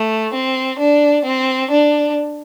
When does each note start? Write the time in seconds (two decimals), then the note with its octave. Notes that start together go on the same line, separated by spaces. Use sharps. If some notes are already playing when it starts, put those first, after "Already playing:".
Already playing: A3
0.34 C4
0.79 D4
1.25 C4
1.71 D4